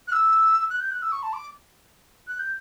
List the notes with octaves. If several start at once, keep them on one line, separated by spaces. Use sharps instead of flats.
F#6
E6
F#6
G6
F#6
E6
C#6
A5
D6
F#6
G6